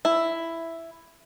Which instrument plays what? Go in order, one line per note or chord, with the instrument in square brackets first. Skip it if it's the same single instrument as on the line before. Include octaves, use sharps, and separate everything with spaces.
[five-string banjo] E4